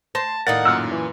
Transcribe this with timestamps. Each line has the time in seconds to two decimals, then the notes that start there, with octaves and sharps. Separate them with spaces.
0.15 C5 A5 A#6
0.47 D#2 A2 D#4 A#4 D5 F5 F#5 A6
0.65 F#2 A#2 E6 F6
0.91 E3